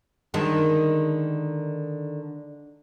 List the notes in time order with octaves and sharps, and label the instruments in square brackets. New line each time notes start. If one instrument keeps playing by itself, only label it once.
[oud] D3 D#3 G#3